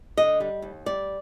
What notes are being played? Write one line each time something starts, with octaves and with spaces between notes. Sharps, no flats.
D3 D#5
G3
D#2
G3 D5